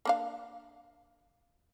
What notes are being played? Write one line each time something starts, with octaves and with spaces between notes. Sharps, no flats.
A#3 D4 F5